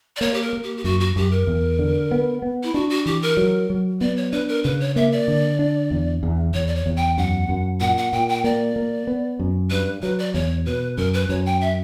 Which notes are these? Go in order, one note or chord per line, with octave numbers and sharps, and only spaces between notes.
D5
A#3 C#5
G4
A#4
A#3
G4
G4
F#2 F#4
F#4
F#2 G4
A#4
E2
D3
B3
B3
E4
D4 F#4
F#4
E3 G4
A#4
F#3
F#3
B3 D5
C#5
D4 B4
A#4
C#3 B4
C#5
A#3 E5
D5
D3
D4
E2
E2
E2 C#5
D5
C#5
E2
G5
F#2 F#5
F#2
A#2 F#5
F#5
A#2 G5
G5
A#3 D5
A#3
B3
F#2
G2 B4
F#3 B4
D5
E2 C#5
B2 B4
F#2 A#4
B4
F#2 C#5
G5
E5